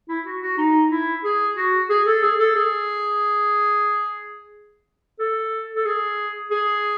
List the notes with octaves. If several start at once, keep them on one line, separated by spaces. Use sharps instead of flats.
E4
F#4
F#4
D#4
E4
G#4
F#4
G#4
A4
G#4
A4
G#4
A4
A4
G#4
G#4